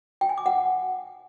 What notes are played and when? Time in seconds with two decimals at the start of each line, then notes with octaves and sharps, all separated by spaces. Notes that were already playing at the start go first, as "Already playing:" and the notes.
0.21 G5
0.29 G#5
0.38 D6
0.46 F#5